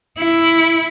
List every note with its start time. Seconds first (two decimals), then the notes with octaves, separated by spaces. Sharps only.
0.18 E4